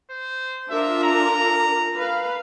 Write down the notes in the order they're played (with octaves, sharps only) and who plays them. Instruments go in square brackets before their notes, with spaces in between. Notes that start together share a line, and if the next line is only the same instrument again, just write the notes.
[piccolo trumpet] C5
[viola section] D4 F4 A#4 [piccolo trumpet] E5
[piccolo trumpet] A#5
[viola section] B4 F5